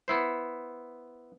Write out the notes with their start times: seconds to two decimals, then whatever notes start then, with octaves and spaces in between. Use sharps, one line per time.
0.08 B3 E4 C5